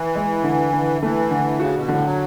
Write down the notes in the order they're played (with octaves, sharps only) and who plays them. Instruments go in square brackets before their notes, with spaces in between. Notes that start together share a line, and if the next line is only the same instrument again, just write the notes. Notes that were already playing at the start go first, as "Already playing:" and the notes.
Already playing: [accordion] E3
[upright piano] G#3
D3
D3
[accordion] E3 [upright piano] A3
[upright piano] D3
[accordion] C#3 [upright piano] F#4
[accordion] B2
[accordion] A2 [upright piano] D3
[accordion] F#3